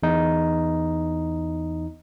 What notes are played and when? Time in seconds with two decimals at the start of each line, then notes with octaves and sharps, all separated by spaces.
0.03 E2 D#4